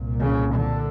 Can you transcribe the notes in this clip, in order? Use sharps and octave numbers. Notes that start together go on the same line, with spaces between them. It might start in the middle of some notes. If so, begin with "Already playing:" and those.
Already playing: C2 A#2
C#3
D3